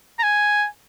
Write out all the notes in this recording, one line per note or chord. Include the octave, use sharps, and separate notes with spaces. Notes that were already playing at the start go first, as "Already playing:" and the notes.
A#5
G#5